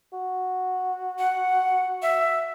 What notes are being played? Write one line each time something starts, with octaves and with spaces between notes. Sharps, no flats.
F#4
F#5
E5